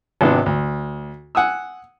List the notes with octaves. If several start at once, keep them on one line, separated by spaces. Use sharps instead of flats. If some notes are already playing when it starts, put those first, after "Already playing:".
G#1 C3 B3 D4
D2
F#5 G#5 D#6 E6